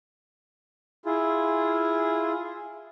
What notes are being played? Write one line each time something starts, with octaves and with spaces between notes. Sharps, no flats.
E4 F4 G#4